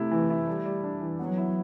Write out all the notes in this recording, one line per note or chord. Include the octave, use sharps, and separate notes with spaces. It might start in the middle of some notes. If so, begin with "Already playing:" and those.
Already playing: C3 A3 E4
E3
E4
G3
G3
D4
E3
F#3 B3
E4